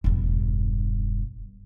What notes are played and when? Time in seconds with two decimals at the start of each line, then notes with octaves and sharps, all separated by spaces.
0.04 E1 G2